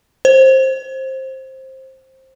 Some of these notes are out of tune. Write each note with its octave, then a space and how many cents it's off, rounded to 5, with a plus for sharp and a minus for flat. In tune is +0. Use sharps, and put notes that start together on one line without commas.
C5 +15